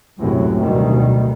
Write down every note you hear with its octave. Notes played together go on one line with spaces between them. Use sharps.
C#2 F#2 A2 C3 F#3
D2 B2 D#3 G3